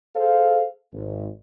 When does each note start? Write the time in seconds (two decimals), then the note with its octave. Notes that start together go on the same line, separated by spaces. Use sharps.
0.15 G#4 A4 C5 F5
0.93 G#1